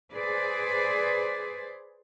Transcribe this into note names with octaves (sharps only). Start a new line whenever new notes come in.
G#4 B4 C5 D5